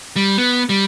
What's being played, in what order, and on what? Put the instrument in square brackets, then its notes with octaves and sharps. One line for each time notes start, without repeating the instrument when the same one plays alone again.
[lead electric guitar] G3
B3
G3